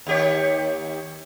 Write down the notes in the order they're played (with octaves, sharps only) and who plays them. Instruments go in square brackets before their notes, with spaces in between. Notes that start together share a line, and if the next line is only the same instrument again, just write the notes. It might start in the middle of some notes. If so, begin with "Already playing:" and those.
[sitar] D#2 G4 C#5